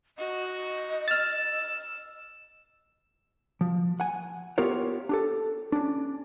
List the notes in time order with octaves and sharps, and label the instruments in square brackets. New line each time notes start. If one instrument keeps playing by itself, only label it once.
[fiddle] F#4 [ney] D#5
[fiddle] E6 [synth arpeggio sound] F6 A6
[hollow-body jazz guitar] F3
F#5 G#5
B3 F4 G4 A#4 C#5
D4 G4 A4
C#4 D4